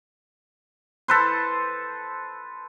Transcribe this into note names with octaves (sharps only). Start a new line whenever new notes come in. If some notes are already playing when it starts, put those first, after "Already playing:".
A4 B4 C5